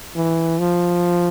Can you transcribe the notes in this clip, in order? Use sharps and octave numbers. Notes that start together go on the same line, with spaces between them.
E3
F3